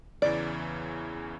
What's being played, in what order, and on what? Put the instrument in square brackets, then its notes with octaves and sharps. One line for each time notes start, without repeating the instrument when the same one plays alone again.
[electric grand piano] E2 C#3 E3 [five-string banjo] D5